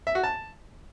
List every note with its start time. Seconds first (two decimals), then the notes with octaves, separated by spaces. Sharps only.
0.07 E5
0.15 F#4
0.23 A5